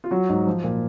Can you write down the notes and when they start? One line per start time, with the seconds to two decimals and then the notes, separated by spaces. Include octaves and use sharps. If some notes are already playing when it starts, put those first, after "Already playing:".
0.04 F4
0.11 F#3 F#4
0.29 G#2
0.47 F3
0.64 A#2